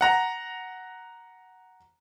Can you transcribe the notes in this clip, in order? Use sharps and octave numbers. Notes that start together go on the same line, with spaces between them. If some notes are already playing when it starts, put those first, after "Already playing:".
F#5 A#5